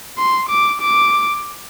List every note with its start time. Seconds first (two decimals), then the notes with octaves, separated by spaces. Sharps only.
0.18 C6
0.49 D6
0.81 D6